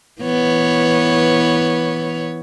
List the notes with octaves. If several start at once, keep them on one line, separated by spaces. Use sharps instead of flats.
E3 B3 C#5